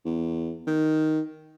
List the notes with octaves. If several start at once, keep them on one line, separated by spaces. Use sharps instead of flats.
E2
D#3